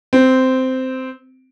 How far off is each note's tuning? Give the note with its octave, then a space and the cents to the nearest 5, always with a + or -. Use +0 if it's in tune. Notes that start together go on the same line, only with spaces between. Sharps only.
C4 -10